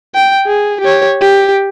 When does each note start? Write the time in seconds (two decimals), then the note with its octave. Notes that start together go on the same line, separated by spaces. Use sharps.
0.15 G5
0.46 G#4
0.81 G4 C#5
1.21 G4